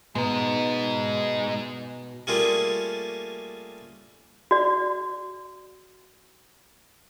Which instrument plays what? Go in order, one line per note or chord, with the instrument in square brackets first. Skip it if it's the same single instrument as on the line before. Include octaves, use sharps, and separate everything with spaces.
[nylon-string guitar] B2 [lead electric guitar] G#3 D#4
[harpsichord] G3 A3 A#3 C#4 F4 G#4
[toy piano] F#4 D5